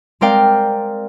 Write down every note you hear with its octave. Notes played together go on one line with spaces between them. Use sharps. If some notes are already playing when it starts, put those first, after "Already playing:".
G#3 C4 A#4 D5 F5 G5